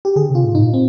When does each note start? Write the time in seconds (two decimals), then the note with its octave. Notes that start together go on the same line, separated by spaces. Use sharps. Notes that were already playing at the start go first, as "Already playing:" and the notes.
0.05 G4
0.16 D3 G#4
0.30 C3
0.35 F4
0.45 G#2
0.55 D#4
0.59 A#2
0.74 C4